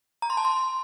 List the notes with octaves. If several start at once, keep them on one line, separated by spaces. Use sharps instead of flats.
A#5
C6
A5
C6